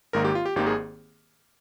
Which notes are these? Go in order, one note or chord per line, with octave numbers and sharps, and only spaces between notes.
G#1 G#2 D#3 A#3 A#4
G4
F4
G4
G#1 G#2 D#3 A#3 G4
G#4